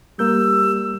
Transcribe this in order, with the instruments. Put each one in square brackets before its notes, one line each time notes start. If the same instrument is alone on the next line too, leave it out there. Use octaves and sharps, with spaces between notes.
[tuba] G3 [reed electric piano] A#3 A#4 G6 [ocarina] E6